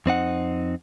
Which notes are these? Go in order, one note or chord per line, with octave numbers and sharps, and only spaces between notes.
F2 C4 D#4 F#5